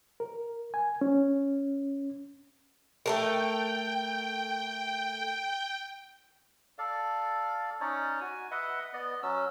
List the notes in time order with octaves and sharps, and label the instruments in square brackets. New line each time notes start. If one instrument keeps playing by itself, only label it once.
[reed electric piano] A#4
G#5
C#4
[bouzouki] A3 A4 A#4 [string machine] G5
[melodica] A4 D5 F5
C#4 D#4 C#5 D5
F#4 G#5
B4 D#5 E5 F#5
B3 D5 D#5
F#3 C#4 E6